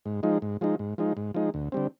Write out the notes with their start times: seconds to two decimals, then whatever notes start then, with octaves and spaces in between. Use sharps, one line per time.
0.06 G#2
0.23 F3 G#3 D#4
0.42 G#2
0.61 F3 G#3 D#4
0.79 G#2
0.98 F3 G#3 D#4
1.17 G#2
1.34 F3 G#3 D#4
1.54 D2
1.72 D3 G3 C4